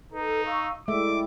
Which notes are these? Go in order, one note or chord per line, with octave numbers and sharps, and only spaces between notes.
D#4 A4 B4 A#5
F5 C#6 E6
G#3 A3 E4 D5 E5 G5 D6